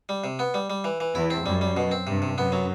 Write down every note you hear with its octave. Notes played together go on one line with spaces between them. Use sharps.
G3
C3
B3
G3
G3
E3
E3
E2 E4
C4
F#2 G3
G3
B2
C4
G2 C3
C3
F#2 B3
F#3